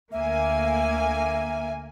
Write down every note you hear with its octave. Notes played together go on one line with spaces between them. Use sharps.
D2 A#3 E5 G#5